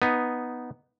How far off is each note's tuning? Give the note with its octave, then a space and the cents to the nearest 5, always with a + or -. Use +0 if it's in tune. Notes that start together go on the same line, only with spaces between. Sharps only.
B3 +0 D#4 +0